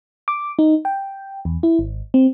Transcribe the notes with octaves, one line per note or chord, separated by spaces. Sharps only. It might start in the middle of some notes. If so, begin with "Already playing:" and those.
D6
D#4
G5
E2
E4
G#1
C4